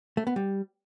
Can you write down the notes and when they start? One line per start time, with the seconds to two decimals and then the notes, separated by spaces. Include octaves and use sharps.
0.17 A3
0.27 B3
0.36 G3